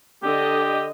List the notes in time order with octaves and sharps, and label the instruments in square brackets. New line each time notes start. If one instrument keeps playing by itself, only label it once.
[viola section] D3 D#5 [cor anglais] G4